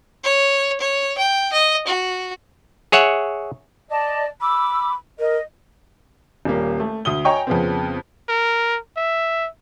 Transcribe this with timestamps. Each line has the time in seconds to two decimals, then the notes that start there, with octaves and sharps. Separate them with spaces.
0.24 C#5
0.81 C#5
1.18 G5
1.53 D#5
1.87 F#4
2.92 G#4 C#5 E5 F#5
3.89 D5 D#5 A5
4.41 B5 D6 E6
5.19 A#4 D#5
6.45 D#1 G3 A#3
6.80 A3
7.05 D2 D#6 G7
7.25 C#5 D#5 G5 G#5 A#5 C#6
7.47 F2 C#3 B3 C4
8.29 A#4
8.97 E5